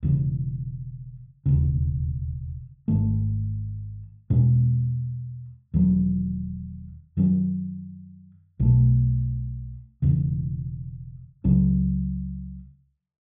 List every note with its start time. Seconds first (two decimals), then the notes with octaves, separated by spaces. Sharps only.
0.03 E1 E2 C#3
1.46 E1 D#2 C#3
2.88 G#1 G#2 D#3 A3
4.30 E2 B2 G#3 C#4
5.74 E1 E2 D#3 F#3
7.17 F#2 D#3 F#3 C#4
8.59 B1 B2 A3
10.02 E1 E2 C#3
11.44 C#2 C#3 F#3 C#4